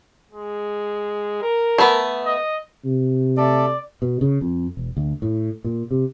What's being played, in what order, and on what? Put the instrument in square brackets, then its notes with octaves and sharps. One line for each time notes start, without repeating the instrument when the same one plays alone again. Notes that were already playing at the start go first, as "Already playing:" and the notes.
[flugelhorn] G#3
A#4
[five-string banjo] A3 B3
[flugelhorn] D#5
[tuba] C3
[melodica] A3 A4 [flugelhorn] D5
[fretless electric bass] B2
C#3
F2
E1
D2
A2
A#2
C3